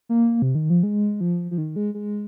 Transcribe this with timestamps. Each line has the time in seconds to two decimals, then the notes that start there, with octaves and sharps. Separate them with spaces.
0.09 A#3
0.42 C3
0.55 D#3
0.70 F3
0.83 G#3
1.21 F3
1.51 F3
1.58 D#3
1.76 G#3
1.94 G#3